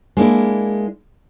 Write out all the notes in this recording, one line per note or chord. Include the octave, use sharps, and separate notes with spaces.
G#3 A#3 D4 E4